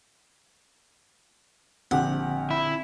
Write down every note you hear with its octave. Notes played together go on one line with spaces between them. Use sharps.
A#1 D3 C4 G4 F#5
E4